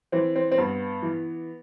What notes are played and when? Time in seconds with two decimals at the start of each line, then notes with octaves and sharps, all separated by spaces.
0.12 E3 C4
0.36 C4
0.52 C4
0.58 G2 B3
1.02 E3